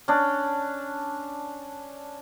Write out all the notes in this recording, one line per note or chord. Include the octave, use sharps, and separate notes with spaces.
C#4 D4